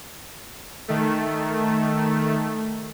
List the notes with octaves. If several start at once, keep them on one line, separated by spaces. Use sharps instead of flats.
D#3 A3